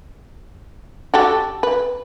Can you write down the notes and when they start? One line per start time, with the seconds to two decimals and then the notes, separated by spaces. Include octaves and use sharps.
1.14 F#4 G4 A4
1.63 B4